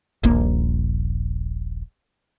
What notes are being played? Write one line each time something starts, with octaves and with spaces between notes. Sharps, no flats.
D#1 A#1 A#3